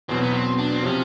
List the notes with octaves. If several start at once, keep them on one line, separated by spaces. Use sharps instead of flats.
E2 B2 F#3 C4
B3
C4
D4
C4
C3 F3 C#4